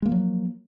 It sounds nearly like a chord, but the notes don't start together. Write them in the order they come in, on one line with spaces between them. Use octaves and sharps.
G#3 A#3 F3 F#3